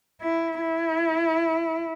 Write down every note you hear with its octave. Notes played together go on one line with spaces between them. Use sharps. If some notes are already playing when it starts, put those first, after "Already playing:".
E4
E4